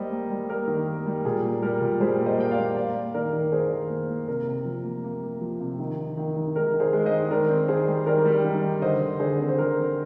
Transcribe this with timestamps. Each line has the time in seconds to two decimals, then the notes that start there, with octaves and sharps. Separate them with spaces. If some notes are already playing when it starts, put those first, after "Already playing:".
Already playing: G3 A#3 C5 D#5
0.11 A#3
0.30 G3
0.49 A#3 A#4
0.67 D#3
0.87 A#3
1.06 G3
1.25 A#2 G#4
1.44 A#3
1.62 G3 A#4
1.82 A#2
2.00 G3 G#4 C5
2.20 A#3
2.26 C5 D#5
2.38 A#3 G5
2.51 D5 F5
2.58 A#3
2.76 A#3 D5 F5
2.95 A#3
3.14 D#3 A#4 D5
3.33 D#3
3.52 D#3 G#4 C5
3.71 D#3
3.90 A#3
4.09 A#3
4.28 C3 A#4
4.47 C3
4.65 F3
4.85 A#3
5.04 A#3
5.23 A#3
5.41 F3
5.60 C3
5.79 D#3
5.99 D#3
6.17 D#3
6.36 D#3
6.55 G#3 A#4
6.74 D#3
6.80 G#4 C5
6.93 G#3
7.05 C5 D#5
7.11 D#3
7.31 D#3 A#4 D5
7.50 C4
7.68 D#3 G#4 C5
7.88 G3
8.06 D#3 A#4 D5
8.25 G3
8.44 D#3
8.63 D#3
8.82 D3 C5 D#5
9.02 D3
9.19 D3 G#4 C5
9.39 C4
9.49 C5
9.58 D3 A#4
9.77 C4